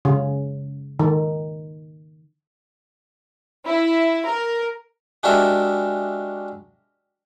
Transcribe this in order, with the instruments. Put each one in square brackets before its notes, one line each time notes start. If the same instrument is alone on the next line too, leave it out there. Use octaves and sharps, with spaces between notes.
[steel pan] C#3
D#3
[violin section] E4
A#4
[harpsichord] G#3 D4 F#4 G4 A#4 E5